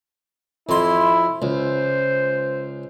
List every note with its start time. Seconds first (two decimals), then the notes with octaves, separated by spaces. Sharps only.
0.69 F2 E4 C6
1.42 C#2 C5